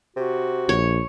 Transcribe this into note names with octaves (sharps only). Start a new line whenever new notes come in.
C3 F#4
A#1 C#5